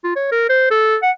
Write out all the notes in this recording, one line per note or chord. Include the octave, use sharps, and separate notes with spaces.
F4
C#5
A#4
C5
A4
F#5